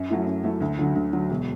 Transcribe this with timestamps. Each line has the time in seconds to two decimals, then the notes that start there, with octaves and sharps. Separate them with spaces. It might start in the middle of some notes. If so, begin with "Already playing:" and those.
Already playing: F#2
0.10 F#3 A3 E4
0.26 F#2
0.44 F#3 A3 E4
0.61 D2
0.78 D3 F#3
0.95 D2
1.13 D3 F#3
1.30 E1